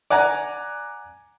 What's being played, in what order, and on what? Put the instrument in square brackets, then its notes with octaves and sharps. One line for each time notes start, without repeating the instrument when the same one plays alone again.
[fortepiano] D5 F#5 G#5 A#5